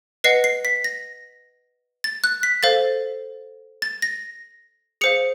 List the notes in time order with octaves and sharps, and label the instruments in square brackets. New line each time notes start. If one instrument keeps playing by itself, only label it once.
[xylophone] B4 D#5 F#5 C7
C7
B6
A#6
A6
F#6
B6
A4 C5 F5 A6
A6
A#6
G#4 C5 F5 C#7